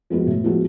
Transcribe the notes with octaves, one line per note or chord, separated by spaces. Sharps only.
F3 G#3 B3 F#4
A2
F3 G#3 B3 F#4